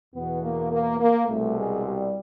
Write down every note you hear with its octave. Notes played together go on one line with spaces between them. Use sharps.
E2 B2 B3
A#3
A#3
A#3
C2 B2 A3
G#3
G3